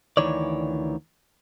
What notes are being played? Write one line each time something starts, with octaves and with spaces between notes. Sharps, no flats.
D2 D#3 E3 C#5 D5